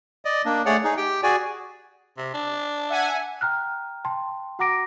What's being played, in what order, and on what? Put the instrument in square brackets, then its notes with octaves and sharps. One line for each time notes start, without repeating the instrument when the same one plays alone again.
[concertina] D5 D#5
A#3 D4
A3 G#4 C#5 D5 F#5
D#4 G#4
G4 G5
F#4 G#4 D5 G#5
[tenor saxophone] C3
D4
[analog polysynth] E5 F#5 G#5
[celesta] G5 A#5 F6 F#6
G5 A5 C6
F#4 F#5 A#5 D6 A#6 D7